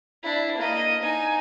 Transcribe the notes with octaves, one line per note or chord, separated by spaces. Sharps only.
D4 E4
A#3 D#5
D#4 G#5